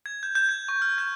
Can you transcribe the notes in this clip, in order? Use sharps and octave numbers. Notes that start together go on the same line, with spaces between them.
G#6
G6
G6
G#6
C#6
F6
G6